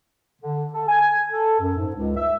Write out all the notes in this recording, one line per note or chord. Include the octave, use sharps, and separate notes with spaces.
D3
A4
G#5
A4
F#2
G#2
C#2
E5